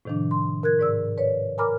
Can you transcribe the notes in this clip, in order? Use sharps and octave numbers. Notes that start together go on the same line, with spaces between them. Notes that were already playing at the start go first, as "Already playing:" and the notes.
A2 C3 D#3 F3 D4
C6
A#4 F#6 G#6
G#2 D5 E6
B4 C#5 D5
A#4 G#5 A#5 B5 D6 F6